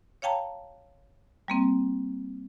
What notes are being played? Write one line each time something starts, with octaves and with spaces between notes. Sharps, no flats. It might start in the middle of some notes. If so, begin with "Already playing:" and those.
C#5 F5 G5 A5 A#5
G3 A#3 C4